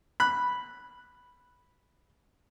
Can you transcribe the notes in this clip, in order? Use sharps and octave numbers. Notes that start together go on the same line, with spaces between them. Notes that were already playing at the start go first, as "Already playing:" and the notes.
B5 F#6